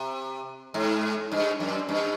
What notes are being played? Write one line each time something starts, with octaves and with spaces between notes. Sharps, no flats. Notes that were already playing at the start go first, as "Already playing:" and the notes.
Already playing: C3
G#2
G2
F#2
G2